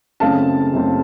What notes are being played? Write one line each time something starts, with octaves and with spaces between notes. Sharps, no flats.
F#1 F#2 C#3 A3 C4 F5 A5
F#1 F#2 C#3 A3 C4